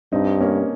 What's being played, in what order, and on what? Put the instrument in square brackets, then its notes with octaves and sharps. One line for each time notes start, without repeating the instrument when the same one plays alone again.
[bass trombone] G2 [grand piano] C4 D#4
[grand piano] A#3 C#4